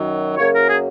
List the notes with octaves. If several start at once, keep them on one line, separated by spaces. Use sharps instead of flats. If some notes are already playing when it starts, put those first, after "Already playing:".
Already playing: F#2 D#3 F#3
F#2 C#3 F#3 A#3 C#5
A#4
G#4